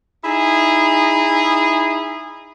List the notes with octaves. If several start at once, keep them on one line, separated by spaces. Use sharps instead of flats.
D#4 E4 G#4